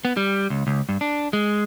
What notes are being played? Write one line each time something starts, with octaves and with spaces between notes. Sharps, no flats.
B3
G3
C#2
C#2
G2
D4
G#3